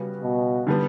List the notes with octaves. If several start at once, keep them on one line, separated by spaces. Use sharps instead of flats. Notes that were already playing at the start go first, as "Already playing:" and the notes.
Already playing: C#3 G3 B3 F#4
B2
D3 G3 B3 D4